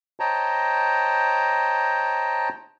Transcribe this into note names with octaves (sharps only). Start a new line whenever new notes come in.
C5 C#5 D#5 G5 A5 A#5